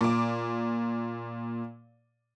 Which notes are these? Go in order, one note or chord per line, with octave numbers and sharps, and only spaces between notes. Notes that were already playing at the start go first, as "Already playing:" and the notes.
A#2 D6